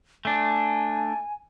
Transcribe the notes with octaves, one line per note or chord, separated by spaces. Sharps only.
A3 D4 G#5